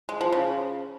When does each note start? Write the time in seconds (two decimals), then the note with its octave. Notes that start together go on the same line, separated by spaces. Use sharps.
0.09 G#3
0.21 F3
0.32 C#3